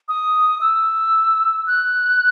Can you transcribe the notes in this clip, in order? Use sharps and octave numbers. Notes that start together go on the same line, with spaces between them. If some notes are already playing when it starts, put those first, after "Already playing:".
D#6
E6
F#6